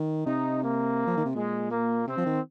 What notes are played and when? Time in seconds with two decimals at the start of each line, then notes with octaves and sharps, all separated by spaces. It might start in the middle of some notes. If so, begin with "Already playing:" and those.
Already playing: D#3
0.26 C3 D#4
0.62 A#3
1.07 F3
1.17 D#3
1.25 C3
1.35 A#2 G#3
1.71 A#3
2.07 C3 C4
2.17 F3
2.26 D#3